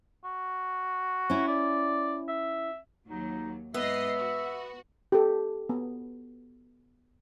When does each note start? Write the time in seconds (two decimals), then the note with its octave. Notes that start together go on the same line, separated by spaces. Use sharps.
0.24 F#4
1.30 C#4 E4
1.48 D5
2.28 E5
3.08 D#2 F#3 D#4
3.74 G#2 B3 D#5 E5 C7
4.19 F#4
5.12 G4 A4
5.69 B3